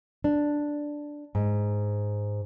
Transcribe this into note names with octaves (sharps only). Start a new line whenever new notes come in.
D4
G#2